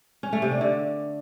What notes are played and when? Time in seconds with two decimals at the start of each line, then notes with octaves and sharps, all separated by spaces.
0.23 C#4
0.33 A3
0.42 C3
0.51 D4
0.61 D3